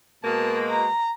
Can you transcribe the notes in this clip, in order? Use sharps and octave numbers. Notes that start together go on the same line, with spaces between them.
B2 G#3 A#3 A5
A#5